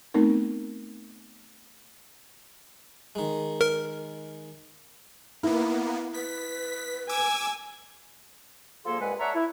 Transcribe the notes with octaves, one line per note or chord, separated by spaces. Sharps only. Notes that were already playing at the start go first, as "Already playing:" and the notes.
A3 B3 C4 D#4 A#4
D#3 G#3
A#4
A#3 B3 E4
B4 B6
G#5 D6 E6
D2 F3 A#3 G#4 A4 C6
C2 G2 G#3 B4 F#5 G#5
A4 C#5 D5 E5 F#5 A#5
E4